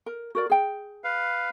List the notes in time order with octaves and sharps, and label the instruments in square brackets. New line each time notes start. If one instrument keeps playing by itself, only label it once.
[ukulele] A#4
F#4 A#4 D5
G#4 G5
[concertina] B4 F5